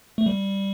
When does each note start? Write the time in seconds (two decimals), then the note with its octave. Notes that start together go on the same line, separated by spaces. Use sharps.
0.18 A3
0.26 G3